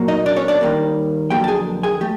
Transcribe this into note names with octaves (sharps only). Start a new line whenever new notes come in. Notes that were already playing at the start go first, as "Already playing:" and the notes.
Already playing: A#2 F#3 A#3
D#4 D#5
D4 D5
C#4 C#5
D4 D5
D#2 D#3 G3 A#3
F2 D3 F#3 A#3 G4 G5
A5
G#4 G#5
G#4 G#5
A3 G4